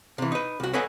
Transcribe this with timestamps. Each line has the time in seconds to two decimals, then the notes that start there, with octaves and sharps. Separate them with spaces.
0.18 C3 E3
0.32 D#4 B4
0.60 C2 F#4
0.73 A4 B4 C#5 D#5 F#5 G#5